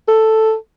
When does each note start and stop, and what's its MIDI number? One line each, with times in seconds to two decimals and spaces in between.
0.08 0.55 69